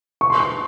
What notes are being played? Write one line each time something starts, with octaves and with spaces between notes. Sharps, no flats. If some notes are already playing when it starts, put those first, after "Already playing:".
C#6
C6
C#6